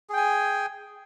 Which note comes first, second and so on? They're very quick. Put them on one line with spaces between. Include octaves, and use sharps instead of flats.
G#4 G5 G#5